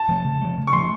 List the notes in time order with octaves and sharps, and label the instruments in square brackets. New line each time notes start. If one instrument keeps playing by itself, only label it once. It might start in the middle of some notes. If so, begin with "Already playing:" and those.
Already playing: [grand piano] A5
[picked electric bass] F3 A3
C#3
F3 A3
C#3
[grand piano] C#6
[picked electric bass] F3 A3 [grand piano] C6